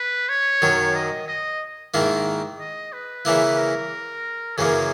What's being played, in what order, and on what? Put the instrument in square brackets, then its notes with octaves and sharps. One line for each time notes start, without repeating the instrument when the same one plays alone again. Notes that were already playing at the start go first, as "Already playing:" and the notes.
Already playing: [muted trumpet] B4
C#5
[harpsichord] F#2 D#3 F#3
[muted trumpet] D#5
D#5
[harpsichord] G#2 D#3 A#3 E4
[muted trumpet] D#5
B4
[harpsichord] C#3 E3 A#3 E4
[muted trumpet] A#4
[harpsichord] F#2 C#3 E3 A#3 [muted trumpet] G#4